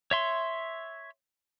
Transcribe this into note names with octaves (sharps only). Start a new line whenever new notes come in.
C#5 E5 C6